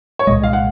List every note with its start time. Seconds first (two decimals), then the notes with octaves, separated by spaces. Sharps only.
0.19 C#5
0.27 C2 A#2 G#3 D#5
0.43 F5
0.53 F#5